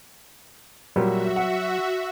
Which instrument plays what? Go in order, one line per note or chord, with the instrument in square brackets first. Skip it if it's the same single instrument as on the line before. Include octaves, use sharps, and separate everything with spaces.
[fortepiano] A#2 G3 [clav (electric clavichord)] F#3 [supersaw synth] F#4 E5
[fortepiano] F#5